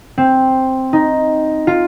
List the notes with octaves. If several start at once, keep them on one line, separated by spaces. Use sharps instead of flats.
C4
D#4
F4